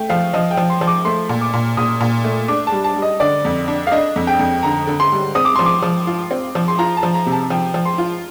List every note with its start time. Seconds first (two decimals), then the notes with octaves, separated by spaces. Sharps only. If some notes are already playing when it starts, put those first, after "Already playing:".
Already playing: A3 G5
0.09 F3 F5
0.33 F3 D#5
0.51 G5
0.57 F3
0.70 C6
0.81 F3
0.87 D6
1.05 A3 C6
1.29 A#2
1.41 D6
1.53 A#2
1.77 A#2 D#6
2.00 A#2
2.24 A3
2.48 D4 D6
2.67 A5
2.72 G3
2.84 A5
2.96 G3
3.02 D#5
3.20 D3 D5
3.45 F2
3.68 D4
3.87 F5
3.91 D4 D#5
4.16 F2
4.27 G5
4.39 F2
4.63 D3 A#5
4.87 D3
5.00 C6
5.12 G3
5.35 C4 D#6
5.45 D6
5.56 F3 C6
5.66 D6
5.82 F3
6.07 F4
6.31 C4
6.55 F3
6.68 C6
6.79 F4 A#5
6.97 A5
7.03 F3
7.14 A#5
7.26 C3
7.32 A5
7.50 F3 G5
7.74 F3
7.85 C6
7.98 F4